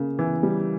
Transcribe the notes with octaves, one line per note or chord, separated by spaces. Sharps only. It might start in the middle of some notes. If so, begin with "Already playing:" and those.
Already playing: C#3 A#3
E3
G3